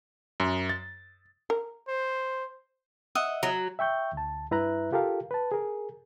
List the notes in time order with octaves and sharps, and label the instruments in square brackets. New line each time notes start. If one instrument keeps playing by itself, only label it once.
[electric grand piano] F#2
A6
[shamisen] A#4
[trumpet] C5
[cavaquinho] D#5 E5 F#5
[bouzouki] F#3
[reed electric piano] E5 G5 C#6 G6
D2 A5
G2 E4 B4 E5 A#5 F#6
F4 G4 A4 A#4 F5
B4 A5
G#4 A#4